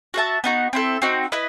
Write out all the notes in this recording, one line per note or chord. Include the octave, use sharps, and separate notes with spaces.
F#4 A4 E5 A5
B3 D#4 F#4
C4 E4 A4
C4 D#4 F#4
E4 B4 D#5